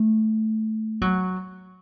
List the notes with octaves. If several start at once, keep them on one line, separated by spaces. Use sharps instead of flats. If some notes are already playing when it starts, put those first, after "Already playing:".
Already playing: A3
F#3